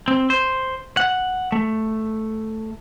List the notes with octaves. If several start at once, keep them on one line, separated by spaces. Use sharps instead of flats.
C4
C5
F#5
A3